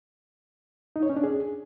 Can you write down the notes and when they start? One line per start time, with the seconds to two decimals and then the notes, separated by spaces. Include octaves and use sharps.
0.96 D#4
1.03 C#5
1.10 C#4
1.17 D4
1.24 G#4